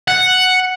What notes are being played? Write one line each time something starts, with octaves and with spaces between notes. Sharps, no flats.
F#5